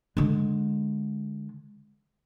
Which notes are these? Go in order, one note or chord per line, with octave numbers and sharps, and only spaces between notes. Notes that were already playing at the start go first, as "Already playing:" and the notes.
D3 G#3